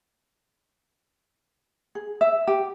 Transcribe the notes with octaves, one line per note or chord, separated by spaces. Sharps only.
G#4
E5
G4